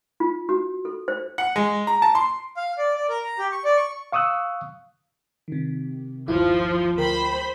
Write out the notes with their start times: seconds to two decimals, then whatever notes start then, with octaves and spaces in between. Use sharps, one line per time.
0.20 F4
0.49 F#4
0.85 A4
1.08 C5
1.38 F#5
1.56 G#3
1.87 A#5
2.02 A5
2.15 C6
2.57 F5
2.78 D5
2.96 D5
3.09 A#4
3.22 A#5
3.38 G4
3.52 C#6
3.65 D5
3.77 C#6
4.12 F5 C#6 D#6 E6 F#6
5.48 C3 D#3
6.28 G1 D#2 F3 E4
6.97 D2 A#4 C5 G5 B5